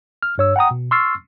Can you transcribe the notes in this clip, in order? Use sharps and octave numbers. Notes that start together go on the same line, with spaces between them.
F6
G2 C#5 E6
F#5 G5 A#5 D#6
B2
C6 C#6 E6 F6 A6 C7